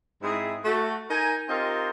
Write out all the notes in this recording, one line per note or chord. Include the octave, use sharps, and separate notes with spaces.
G#2 G#3 C4 E4 G#4
A3 F#4
D#4 A#4 G#5
C4 D#4 F4 G4 A#4